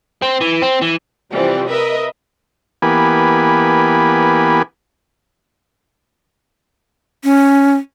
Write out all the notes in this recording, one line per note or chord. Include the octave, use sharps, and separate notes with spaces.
C4
E3
C4
E3
C3 E3 F3 G3 C4
A#4 B4 D#5 E5
E3 A#3 B3 G4 G#5 B5
C#4